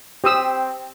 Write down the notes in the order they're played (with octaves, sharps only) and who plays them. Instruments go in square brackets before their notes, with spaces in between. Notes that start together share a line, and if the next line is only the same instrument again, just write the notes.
[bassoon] C4 [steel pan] G4 D#6 E6